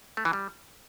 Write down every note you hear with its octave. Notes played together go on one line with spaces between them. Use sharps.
A3
E3
G3